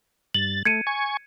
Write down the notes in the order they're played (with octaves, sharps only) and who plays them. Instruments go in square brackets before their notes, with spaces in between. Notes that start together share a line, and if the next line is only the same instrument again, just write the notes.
[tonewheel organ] G2 A6 [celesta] F#7
[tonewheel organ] A3 [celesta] G#6 C#7 D#7
[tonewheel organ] G#5 C#6